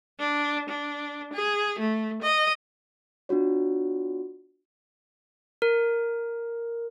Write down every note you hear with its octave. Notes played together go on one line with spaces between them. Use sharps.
D4
D4
G#4
A3
D#5
B3 D4 F4 F#4 C#5
A#4